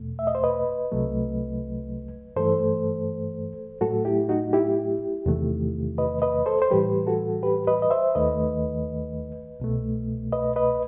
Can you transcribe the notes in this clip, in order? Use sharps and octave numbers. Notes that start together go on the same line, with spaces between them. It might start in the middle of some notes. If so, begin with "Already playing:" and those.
Already playing: E2 B2 A3
E5
D#5
C5
B4 D#5
C2 C3 F#3 A3
G2 E3 A3 A4 C5
A2 F#3 A3 F#4 A4
E4 G4
D#4 F#4
E4 G4
E2 C3 D#3 A3
B4 D#5
B4 D#5
A4 C5
C5
A2 E3 G3 G4 B4
F#4 A4
G4 B4
B4 D#5
D#5
C5 E5
D#2 D#3 A3 B4 D#5
C2 B2 A3
B4 D#5
B4 D#5